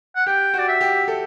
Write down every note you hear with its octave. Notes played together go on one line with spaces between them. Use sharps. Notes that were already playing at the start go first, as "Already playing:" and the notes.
F#5
G4 G5
F#4 D5
E5
G4
A4